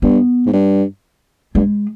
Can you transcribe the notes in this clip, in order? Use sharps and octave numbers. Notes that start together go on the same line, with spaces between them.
G2 B3
G#2
G2
G2 G#3